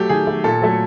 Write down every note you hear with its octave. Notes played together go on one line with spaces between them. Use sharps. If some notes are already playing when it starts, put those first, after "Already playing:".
Already playing: F#3 A3 G4
D#3 G#4
F#3 A3
A#2 A4
F#3 A3